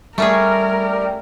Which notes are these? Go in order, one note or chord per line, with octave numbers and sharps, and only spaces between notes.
G3 A3 C#4 G#4 A#4